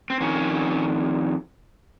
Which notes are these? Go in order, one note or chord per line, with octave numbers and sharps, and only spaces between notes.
C4
F2 D#3 C#4